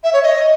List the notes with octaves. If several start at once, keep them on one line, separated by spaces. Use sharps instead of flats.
E5
C#5
D#5